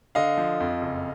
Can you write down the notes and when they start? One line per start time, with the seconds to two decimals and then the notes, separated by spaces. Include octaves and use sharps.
0.15 D3 D#5 F5
0.38 F3
0.60 F2
0.81 F#1